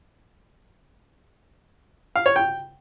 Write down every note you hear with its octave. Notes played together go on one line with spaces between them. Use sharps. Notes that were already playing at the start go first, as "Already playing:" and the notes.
F5
C#5
G5